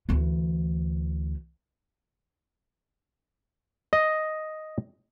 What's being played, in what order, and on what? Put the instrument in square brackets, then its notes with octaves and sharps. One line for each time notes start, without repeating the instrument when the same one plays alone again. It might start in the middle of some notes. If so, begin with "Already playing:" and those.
[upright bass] D2 E3
[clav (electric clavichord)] D#5